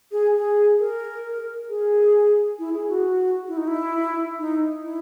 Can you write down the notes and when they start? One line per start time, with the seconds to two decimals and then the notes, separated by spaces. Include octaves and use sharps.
0.12 G#4
0.35 G#4
0.79 A#4
1.69 G#4
2.59 E4
2.74 G#4
2.89 F#4
3.48 E4
3.57 D#4
3.67 E4
4.39 D#4
4.83 E4